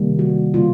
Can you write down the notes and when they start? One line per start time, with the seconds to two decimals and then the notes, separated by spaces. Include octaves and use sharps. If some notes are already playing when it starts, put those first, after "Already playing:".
Already playing: C3 D#3 G3 A#3
0.19 F#4
0.54 C#3 E3 G3 A#3 F4